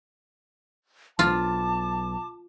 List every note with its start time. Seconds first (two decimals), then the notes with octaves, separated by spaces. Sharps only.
1.19 B1 F4 A5 D6